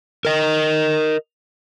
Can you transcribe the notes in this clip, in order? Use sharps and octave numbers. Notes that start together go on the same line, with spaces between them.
A#4 D#5